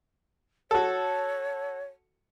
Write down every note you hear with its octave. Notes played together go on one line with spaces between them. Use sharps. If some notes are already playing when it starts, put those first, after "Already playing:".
F#4 A4 C#5